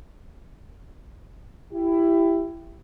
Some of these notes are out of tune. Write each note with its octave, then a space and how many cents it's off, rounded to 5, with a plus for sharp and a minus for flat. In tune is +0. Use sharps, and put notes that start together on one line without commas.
E4 +15 G4 +0